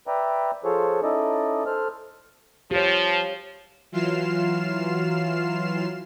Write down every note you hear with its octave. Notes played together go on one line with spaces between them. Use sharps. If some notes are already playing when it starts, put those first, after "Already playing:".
B4 D5 E5 G5 A#5
F3 F4 G#4 A4 C5 C#5
C#4 D#4 E4 A4 D5 D#5
A4 C5 F6
F3 G4 C#5
E3 F#3 F4 F6 C7 E7